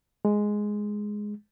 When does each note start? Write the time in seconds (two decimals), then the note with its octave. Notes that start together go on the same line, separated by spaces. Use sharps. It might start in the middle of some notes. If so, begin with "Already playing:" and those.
0.25 G#3